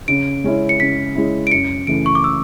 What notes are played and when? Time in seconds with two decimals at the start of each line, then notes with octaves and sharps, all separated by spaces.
0.08 C#3 D7
0.44 G#3 C#4 E4
0.69 C#7
0.79 C#3 B6
1.15 G#3 C#4 E4
1.47 D7
1.51 F#2 C#7
1.87 C#3 E3 A3 D7
2.06 C#6
2.15 D6
2.24 E6